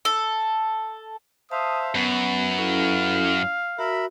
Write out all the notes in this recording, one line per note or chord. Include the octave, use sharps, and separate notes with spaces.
A4
C5 E5 F5 A5 D#6
F#2 B3 F#4 B4
C#4 E4 A4 F5
F#4 A#4 E5 B5